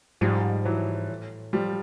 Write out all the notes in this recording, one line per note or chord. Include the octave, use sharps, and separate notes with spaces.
G#2 F3 G3
E3 F#3
A2
F3 G3